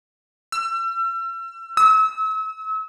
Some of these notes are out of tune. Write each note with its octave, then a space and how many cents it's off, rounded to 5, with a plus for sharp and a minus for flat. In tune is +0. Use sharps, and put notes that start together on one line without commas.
E6 +40
E6 -35